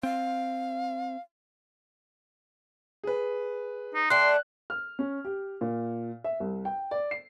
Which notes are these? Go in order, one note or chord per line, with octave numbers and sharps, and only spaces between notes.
C4 F5
G#4 B4
D#4
A3 D4 G5 C6 F#6
F6
C#4
G4
A#2
E5
C2
G5
D5
C7